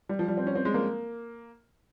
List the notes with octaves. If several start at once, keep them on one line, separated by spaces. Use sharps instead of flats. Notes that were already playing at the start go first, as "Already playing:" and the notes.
G3
F3
G3
C4
C#4
C4
G#3
A#3